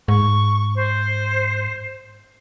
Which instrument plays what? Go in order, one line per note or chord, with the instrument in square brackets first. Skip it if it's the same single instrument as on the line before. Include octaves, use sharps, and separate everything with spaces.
[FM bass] G#2 [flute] C#6
[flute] C5